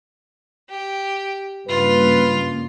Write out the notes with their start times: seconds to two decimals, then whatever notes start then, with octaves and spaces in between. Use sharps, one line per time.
0.69 G4
1.69 G2 C#3 A#3 F4 B4